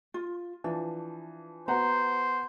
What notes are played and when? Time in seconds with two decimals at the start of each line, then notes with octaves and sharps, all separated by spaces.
0.14 F4
0.64 E3 F3 D4
1.68 B3 F#4 C5 F#5 A#5